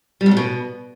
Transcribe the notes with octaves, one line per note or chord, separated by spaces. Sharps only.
G3
F2
A#2
B2